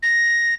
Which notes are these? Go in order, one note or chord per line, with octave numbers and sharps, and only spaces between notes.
A#6